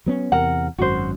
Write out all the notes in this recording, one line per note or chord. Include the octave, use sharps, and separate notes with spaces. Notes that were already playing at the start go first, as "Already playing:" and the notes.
F#3 B3 C#4
E2 C3 A#4 F#5
G#1 F#2 F#4 C5